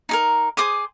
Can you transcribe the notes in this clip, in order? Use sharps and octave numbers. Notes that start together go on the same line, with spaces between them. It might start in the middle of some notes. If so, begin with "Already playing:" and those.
D#4 G#4 A#4
G#4 C5 D6 D#6